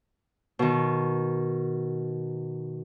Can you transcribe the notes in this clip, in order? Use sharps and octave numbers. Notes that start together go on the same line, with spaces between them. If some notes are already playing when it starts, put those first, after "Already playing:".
B2 D#3